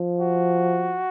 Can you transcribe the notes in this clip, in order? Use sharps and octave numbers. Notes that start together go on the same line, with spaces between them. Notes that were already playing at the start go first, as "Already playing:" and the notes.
Already playing: F3
F#4